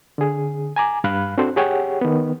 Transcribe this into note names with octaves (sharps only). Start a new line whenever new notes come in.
D3 G#4
G#5 A#5 D6
G2 F5 B5 F#6
C4 D4 F#4 A4 C5
G4 G#4 C#5 F#5 G5
D#3 B3